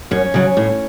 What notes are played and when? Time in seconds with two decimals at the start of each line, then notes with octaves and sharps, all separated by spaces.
0.11 F#2 C#4
0.34 C#3 F#3
0.57 A2